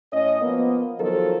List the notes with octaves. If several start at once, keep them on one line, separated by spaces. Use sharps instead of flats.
A2 C#4 D#5
F3 A#3 B3
D#3 F3 F#3 A4 A#4